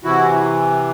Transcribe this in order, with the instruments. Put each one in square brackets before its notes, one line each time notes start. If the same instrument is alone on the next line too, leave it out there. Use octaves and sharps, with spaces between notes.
[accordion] C3 E3 E4 F#4